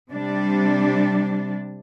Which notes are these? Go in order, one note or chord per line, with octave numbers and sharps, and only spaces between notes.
C3 G3 D4